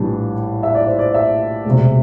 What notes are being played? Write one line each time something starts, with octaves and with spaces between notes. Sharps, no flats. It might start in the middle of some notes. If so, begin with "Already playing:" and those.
Already playing: A#1 A2 E3 G3 D4
E5
D5
C5
D5
E5
E1 D2 C3